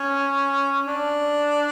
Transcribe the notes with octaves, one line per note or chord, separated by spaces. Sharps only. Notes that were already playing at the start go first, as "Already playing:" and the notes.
Already playing: C#4
D4